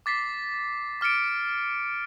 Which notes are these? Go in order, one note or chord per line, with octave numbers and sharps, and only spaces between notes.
D6 A6 B6 C7
D6 F6 A6 C#7 D7